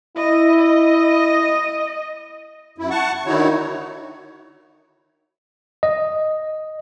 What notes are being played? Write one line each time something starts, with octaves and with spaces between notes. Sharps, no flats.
E4 D#5
D#5
F#2 E4
F#5 A5 C#6
D3 D#3 D#4 E4 F#4 C#5
D#5